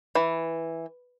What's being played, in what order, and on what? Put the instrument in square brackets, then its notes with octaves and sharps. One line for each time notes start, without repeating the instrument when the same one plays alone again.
[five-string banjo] E3